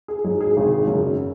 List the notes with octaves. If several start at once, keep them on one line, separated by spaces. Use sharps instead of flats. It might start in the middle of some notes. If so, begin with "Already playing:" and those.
G#4
G#2 F#3 G#4
G#4
G#1
F#2 C#3 F#3